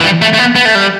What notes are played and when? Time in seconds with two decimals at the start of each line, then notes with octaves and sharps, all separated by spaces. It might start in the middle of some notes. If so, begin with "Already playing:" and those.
0.01 E3
0.04 G3
0.22 A3
0.34 A3
0.39 B3
0.56 B3
0.65 A3
0.75 G3